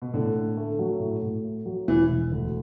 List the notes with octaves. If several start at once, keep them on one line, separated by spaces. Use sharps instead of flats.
B2
A2 D3
A2
A3
F#3
A2
A2
A3
F#3
E1 E3
E1
D2